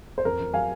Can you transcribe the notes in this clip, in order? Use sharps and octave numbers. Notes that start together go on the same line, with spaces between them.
C5
F2 A#4
F2
F#3 F5 G#5